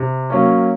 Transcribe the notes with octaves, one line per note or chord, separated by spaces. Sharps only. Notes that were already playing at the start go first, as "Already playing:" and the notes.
Already playing: C3
F#3 A#3 C#4